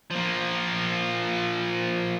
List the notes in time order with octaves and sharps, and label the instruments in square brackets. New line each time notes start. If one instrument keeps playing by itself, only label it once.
[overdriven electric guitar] F3 A#3